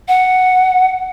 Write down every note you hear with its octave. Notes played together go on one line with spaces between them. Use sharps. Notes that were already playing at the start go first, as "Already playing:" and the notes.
F#5